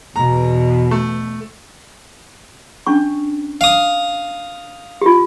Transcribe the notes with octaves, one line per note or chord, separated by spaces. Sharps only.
E2 B2 A#5
A3
C#4 D4 C#6
F5 D#6
F4 G4